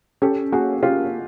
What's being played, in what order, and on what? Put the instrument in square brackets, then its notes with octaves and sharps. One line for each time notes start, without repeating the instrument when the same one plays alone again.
[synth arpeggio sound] C#4 [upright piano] G4 A4
[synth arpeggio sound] A#3 [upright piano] F#4 G#4
[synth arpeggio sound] C#4 [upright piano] F4 G4